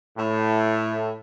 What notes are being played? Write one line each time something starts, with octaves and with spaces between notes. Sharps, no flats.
A2